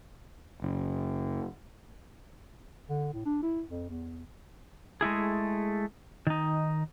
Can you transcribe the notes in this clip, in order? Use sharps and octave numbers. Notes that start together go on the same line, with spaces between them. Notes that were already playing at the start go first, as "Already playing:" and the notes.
F#1
D3
A2
D4
E4
F2
E2
G#3 A3 E4 G#4
D#3 D#4